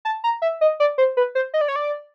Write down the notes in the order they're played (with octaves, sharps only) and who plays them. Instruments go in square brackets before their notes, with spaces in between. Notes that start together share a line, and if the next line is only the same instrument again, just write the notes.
[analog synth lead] A5
A#5
E5
D#5
D5
C5
B4
C5
D#5
D5
C#5
D5